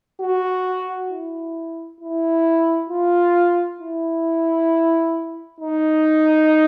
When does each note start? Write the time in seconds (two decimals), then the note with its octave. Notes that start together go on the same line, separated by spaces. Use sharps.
0.20 F#4
1.10 E4
2.00 E4
2.90 F4
3.80 E4
5.60 D#4